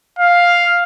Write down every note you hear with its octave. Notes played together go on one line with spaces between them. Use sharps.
F5